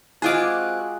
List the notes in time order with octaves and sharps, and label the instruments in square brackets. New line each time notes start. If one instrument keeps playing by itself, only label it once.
[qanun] G#3 F4 G#4 [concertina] C4 F#4 F#6 [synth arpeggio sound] G#5 D6